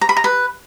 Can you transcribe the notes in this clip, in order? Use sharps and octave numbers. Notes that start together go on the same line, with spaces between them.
A#5
B5
A#5
B4